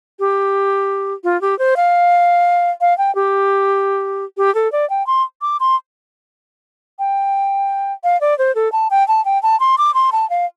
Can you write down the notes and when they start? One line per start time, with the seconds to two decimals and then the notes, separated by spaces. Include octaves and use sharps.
0.19 G4
1.24 F4
1.41 G4
1.59 C5
1.76 F5
2.81 F5
2.98 G5
3.15 G4
4.37 G4
4.55 A4
4.72 D5
4.90 G5
5.07 C6
5.42 D6
5.60 C6
6.99 G5
8.04 F5
8.21 D5
8.38 C5
8.55 A4
8.72 A5
8.91 G5
9.08 A5
9.25 G5
9.43 A5
9.60 C6
9.78 D6
9.94 C6
10.12 A5
10.30 F5